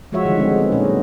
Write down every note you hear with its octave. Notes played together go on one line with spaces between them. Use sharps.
F3 G#3 F4 F#4 C#5 E5
D3 D#3 F3 G3
G#3 C4
B3
A#2 C#4 D#4
F#3